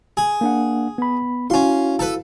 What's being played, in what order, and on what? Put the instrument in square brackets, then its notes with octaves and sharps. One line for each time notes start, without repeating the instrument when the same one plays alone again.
[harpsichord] G#4
[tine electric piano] A#3 D4 F#5
B3 B5
[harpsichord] C#4 C6 [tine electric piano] E4 F#4 F5
[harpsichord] A4 B4